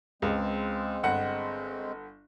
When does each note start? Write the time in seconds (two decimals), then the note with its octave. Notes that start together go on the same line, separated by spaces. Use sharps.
0.22 C#2 G#3 C4
1.03 G1 F#5